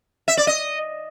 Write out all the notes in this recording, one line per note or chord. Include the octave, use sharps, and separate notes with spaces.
E5
D5
D#5